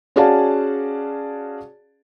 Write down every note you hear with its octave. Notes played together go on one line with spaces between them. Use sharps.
C#4 F#4 G#4 D5 F5 A5